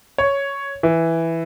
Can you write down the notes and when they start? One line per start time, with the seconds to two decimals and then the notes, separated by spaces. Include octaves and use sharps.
0.18 C#5
0.83 E3